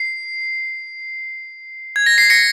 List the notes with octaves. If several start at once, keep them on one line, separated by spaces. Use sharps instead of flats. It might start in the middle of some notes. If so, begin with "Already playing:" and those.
Already playing: C7
G#6
A#6
C7
A#6 C#7